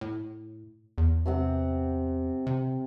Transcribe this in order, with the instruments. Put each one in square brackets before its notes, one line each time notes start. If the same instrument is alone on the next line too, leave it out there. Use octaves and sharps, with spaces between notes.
[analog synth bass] A2
E2
[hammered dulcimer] C3 C4 F#5
[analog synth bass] C3